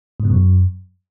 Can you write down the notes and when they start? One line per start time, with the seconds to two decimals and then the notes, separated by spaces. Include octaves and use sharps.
0.20 G#2
0.25 B2
0.30 F#2